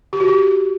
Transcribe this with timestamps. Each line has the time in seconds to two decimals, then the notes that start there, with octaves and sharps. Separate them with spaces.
0.13 G4
0.20 F#4
0.27 G4